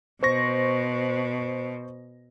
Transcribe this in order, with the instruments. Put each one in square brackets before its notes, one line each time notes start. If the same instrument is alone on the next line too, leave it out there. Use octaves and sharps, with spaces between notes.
[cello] B2 [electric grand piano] C5 C#6 A#6